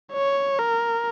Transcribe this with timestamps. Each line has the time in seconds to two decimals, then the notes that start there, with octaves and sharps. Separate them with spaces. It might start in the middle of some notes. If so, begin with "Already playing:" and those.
0.13 C#5
0.59 A#4